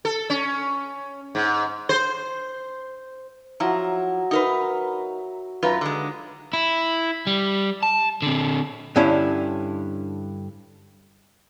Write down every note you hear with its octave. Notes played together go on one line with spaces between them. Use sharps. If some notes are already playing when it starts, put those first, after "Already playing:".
A4
C#4
G#2
C5
F3 F#3 E4 A#5
D#4 A#4 B4 E5
F#2 D#4 F4 B4 A#5
D3 G#3
E4
G3
A5
D3 C4
G2 D3 C#4 E4